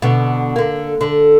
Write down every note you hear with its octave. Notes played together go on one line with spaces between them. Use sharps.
B2 D3
D3 A#3
D3